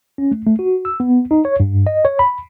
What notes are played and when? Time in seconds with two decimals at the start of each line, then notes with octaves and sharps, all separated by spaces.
0.18 C#4
0.32 A3
0.47 A3
0.59 F#4
0.85 E6
1.00 B3
1.31 D#4
1.45 C#5
1.60 G2
1.87 D#5
2.05 C#5
2.19 B5